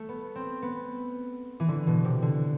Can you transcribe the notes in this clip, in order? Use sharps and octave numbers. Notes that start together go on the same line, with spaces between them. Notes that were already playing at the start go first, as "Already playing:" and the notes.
Already playing: A3
B3
C4
B3
E3
D3
B2
C3
D3